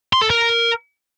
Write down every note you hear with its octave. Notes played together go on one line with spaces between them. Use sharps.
C6
A4
A#4